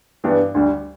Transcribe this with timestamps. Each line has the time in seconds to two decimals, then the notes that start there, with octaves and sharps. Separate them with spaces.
0.24 G2 E3 B3 D4 G4
0.54 D2 D3 G3